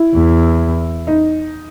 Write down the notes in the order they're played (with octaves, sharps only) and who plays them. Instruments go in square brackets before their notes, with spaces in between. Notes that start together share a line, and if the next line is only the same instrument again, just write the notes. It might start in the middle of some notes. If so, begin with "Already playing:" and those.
Already playing: [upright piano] E4
[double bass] E2
[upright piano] D#4